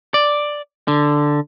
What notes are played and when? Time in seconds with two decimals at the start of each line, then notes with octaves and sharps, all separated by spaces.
0.14 D5
0.88 D3